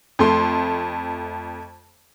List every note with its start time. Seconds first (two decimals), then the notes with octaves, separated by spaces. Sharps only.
0.19 F2 A3 C6